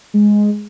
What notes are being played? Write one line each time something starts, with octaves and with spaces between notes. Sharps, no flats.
G#3